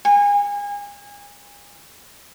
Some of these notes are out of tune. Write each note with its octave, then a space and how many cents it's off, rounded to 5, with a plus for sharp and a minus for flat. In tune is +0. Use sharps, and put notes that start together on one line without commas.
G#5 -30